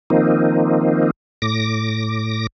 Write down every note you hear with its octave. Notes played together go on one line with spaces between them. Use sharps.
D#3 F3 A#3 C4 D#4
A2 D6 A#6